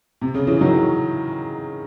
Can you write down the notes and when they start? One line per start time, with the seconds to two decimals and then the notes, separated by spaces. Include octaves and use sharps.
0.21 C3
0.35 C#3
0.47 C#3 E3
0.61 D#3 F#3